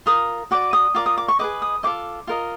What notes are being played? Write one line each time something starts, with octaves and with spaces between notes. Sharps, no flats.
F4 A#4 D#6
F#4 B4 D5 D6
D#6
F4 A#4 D5 D6
D#6
D6
C#6
G#4 B4 D#5 D6
D#6
F4 A4 C5 D#5 D6
F4 A#4 D#5